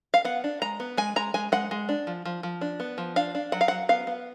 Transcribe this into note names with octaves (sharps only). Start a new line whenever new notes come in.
F5
B3 F#5
D4
G#3 A#5
B3
G#3 G#5
G#3 A#5
G#3 G#5
G#3 F#5
G#3
D4
F3
F3
F3
D4
B3
F3
D4 F5
D4
F#3 F#5
F5
F#3 F#5
B3 F5
B3